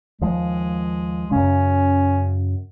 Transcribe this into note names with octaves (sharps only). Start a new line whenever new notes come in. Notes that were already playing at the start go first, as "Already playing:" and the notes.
D#2 F3 G#3
F#2 C#3 C#4